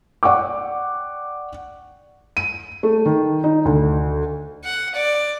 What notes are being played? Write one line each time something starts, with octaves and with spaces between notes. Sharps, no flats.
D5 F#5 G5 C#6 D6
D#7
A3
D#3
D#4
D2
F#5
D5